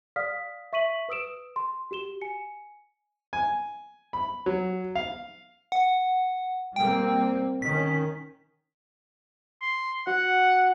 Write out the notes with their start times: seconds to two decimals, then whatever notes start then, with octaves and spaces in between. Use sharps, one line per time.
0.16 D5 F5 D#6 F6 B6
0.73 E5 C#6 B6 D#7 F#7
1.09 B4 D#6 E6 D7 E7
1.56 C6
1.91 F#4 G4 E7 G7
2.21 G#5 C#7
3.33 G#5
4.13 B5
4.46 F#3
4.95 F5
5.72 F#5
6.76 G3 A#3 C4 G5
7.62 D#3 C#4 B6
9.62 C6
10.07 F#4 F#5